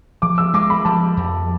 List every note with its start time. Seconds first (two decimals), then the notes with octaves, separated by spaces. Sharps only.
0.22 F3 D6
0.38 E6
0.54 G#3 D6
0.70 B5
0.85 F3 A5
1.17 F2